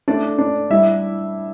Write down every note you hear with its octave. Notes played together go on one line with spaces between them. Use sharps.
A3 D4 D5
D4
G3 E4 E5